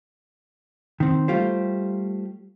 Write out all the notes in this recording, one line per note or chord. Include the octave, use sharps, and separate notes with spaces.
D#3 C4
G3 A3 F4 G4 C5